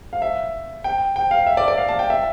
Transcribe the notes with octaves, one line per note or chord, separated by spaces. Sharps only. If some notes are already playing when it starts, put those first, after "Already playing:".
F5
E5
G5
G5
F5
E5
D5
D5
F5
A5
G5
E5